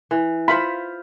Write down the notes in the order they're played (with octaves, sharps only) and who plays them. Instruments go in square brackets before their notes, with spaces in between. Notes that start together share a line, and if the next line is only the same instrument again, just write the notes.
[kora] E3
[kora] F4 C5 [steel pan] B5